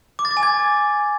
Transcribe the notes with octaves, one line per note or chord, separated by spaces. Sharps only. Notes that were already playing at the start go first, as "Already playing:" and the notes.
D6
A6
D6
G#5
G#6